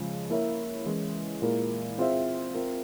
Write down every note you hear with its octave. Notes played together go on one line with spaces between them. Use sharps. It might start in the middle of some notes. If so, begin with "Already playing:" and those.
Already playing: C#3 F3 G#3
A#3 E4 A#4 C#5 E5
E3 G#3 C#4
A#2 G#3 E4 A#4
C4 F4 G#4 C5 E5
C4 F4 A#4